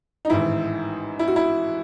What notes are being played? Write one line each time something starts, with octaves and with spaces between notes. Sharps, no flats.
D#4
A1 G#2 D#3 E4
E4
F#4
E4